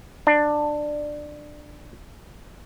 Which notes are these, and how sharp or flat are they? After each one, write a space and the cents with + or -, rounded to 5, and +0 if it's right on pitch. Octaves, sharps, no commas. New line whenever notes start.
D4 +15